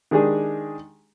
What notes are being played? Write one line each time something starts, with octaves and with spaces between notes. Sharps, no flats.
D#3 G#3 D4 G4 G#4